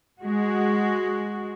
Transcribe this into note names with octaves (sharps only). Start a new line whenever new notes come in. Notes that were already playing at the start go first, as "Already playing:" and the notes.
G#3 F#4